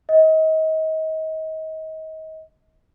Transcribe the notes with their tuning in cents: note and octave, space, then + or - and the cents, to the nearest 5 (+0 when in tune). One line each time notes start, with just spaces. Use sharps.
D#5 +30